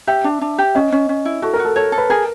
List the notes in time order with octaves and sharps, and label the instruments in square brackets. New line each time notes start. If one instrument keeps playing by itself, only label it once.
[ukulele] G4 [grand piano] E5
[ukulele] D4
D4
G4
[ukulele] C#4 [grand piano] D#5
[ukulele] C#4
C#4
E4
[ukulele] F#4 [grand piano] A4
[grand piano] A#4
[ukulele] F#4
[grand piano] A4
[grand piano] A4 [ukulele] C#5
[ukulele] A4
[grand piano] B4
[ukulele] G#4 [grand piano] A#4